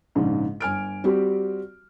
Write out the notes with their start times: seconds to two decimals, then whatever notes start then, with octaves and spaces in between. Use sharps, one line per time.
0.15 A#1 G#2 C#3
0.60 G1 G#5 F6 D7
1.04 G3 C4 F#4 G4